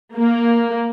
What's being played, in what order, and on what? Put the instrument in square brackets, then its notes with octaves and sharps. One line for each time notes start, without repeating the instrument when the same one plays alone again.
[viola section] A#3